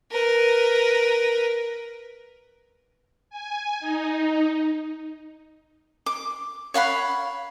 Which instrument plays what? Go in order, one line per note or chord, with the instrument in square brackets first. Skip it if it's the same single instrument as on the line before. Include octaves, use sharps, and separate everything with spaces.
[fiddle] A#4 B4
[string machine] G#5
D#4
[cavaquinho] D6
C#5 F5 F#5 B5